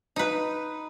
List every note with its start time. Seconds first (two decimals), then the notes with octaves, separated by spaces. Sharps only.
0.16 D#4 B4